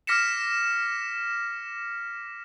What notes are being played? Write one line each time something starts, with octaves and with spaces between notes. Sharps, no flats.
D6 F6 A#6 B6 C#7 E7